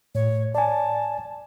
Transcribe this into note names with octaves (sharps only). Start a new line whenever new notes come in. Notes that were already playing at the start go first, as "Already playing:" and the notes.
A2 C#5
D5 G#5 A5